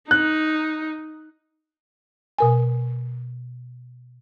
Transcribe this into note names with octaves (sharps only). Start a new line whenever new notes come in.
D#4 F#6
B2 A#4 G#5